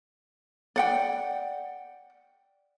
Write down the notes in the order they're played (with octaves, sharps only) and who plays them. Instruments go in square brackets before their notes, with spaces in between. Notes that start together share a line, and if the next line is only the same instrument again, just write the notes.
[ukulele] D5 F#5 G5